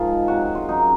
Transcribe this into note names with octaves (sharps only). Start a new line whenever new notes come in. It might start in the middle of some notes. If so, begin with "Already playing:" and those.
Already playing: G#2 F3 F4 G#4 A#4
C3 F#3 F#4
F4
F#2 C#3 F#3 D#4